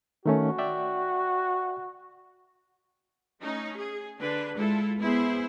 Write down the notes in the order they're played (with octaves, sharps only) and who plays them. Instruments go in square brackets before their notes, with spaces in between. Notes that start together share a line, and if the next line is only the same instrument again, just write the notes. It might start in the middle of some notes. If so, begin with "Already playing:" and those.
[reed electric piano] D#3 A3 C#4 [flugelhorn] F#4
[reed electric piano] D5 E5 G5
[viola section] A3 C#4 D#4
G#4
D3 D4 B4
[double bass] G#3 [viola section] E4 F4 A4
[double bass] B3 [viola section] E4 G#4 C5